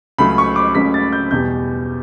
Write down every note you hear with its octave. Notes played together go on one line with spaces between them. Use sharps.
C#2 C#3 F#3 A3 B5
C#6
D6
C#2 C#3 F#3 A3 B6
A6
G6
E2 B2 G3 G6